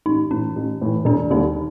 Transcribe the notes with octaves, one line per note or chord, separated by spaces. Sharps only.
A1 D#4
A2 E3 C#4
A1
A2 E3
E1 D4
D#2 D3 G3 D#4